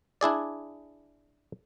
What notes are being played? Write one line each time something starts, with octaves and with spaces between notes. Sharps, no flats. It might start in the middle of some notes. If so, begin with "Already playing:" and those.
D4 E4 G#4 D5